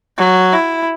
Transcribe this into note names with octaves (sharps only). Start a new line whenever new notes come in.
F#3
E4